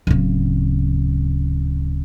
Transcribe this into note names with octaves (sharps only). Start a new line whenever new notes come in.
D1 C#3